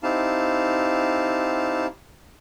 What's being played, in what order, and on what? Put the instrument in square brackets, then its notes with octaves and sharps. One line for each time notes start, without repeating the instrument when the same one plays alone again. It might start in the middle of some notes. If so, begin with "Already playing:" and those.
[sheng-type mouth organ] C4 D#4 E4 G4 F5 A5